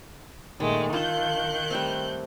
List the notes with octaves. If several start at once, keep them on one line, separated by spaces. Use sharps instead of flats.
A#2 D#3 G#3 A3
D#3 F4 A4 F#6 G6
G3 A3 C4